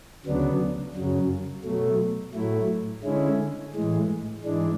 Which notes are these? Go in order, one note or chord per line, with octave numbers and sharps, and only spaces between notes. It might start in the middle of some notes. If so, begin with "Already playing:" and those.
D2 C#3 F#3 B3 D4
F#2 C#3 F#3
B2 F#3 A3
A2 F#3 A3 E4
D3 G#3 C#4 E4
A2 E3 G#3
G#2 E3 G#3 D4